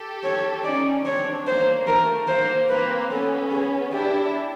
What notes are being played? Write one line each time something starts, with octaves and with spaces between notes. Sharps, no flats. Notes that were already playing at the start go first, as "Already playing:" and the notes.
Already playing: G4 A4
C#5
C#4 D#4 D5
C4 D4 C#5
A#3 C5
A3 A#4
A#3 C5
A#3 C4 B4
B3 C#4 A4
G#4
D4 E4 G4